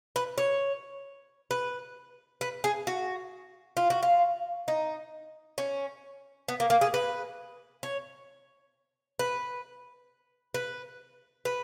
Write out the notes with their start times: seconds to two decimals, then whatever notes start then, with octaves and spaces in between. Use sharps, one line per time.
0.16 B4
0.38 C#5
1.51 B4
2.41 B4
2.64 G#4
2.87 F#4
3.77 F4
3.90 F#4
4.03 F4
4.68 D#4
5.58 C#4
6.48 B3
6.60 A#3
6.70 A#3
6.81 G#4
6.94 B4
7.83 C#5
9.19 B4
10.54 B4
11.45 B4